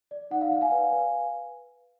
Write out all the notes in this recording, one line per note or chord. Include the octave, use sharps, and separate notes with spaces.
D5
D#4 F#5
F5
D5 F#5
F5 G#5
B4
B4